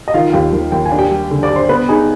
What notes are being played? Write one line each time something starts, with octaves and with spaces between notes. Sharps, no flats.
D#5
D#3 F4 F5
F5
D#2 G4 G5
D#2
D#2 G5
G#5
D4
G4 G5
G3
D3
D5 D6
G2
C5 C6
B3 B4 B5
D#4 G#4 G#5